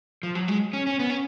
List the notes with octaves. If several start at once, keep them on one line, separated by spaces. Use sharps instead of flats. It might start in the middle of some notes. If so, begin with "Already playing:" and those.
F3
F#3
G#3
C#4
C#4
B3
C#4